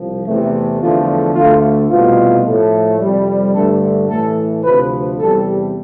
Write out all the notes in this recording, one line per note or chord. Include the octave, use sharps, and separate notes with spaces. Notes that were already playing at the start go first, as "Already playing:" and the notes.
Already playing: C2 F3
E2 C3 E3 A3
E2 D3 F3 A3 F4
D2 D3 A3 F4
C2 B2 A3 F4
A2 F3 A3
F2 C3 G3
G2 D3 A3 A4
A2 E3 A3 A4
D2 C3 F3 B4
E2 C3 G3 A4